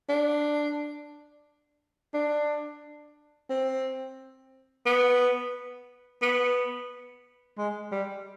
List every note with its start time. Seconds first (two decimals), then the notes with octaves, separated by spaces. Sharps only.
0.09 D4
2.14 D4
3.50 C4
4.86 B3
6.22 B3
7.58 G#3
7.92 G3